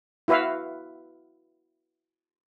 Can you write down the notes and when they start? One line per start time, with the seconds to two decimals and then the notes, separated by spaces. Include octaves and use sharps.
0.28 E4 F#4 B4 E5 F5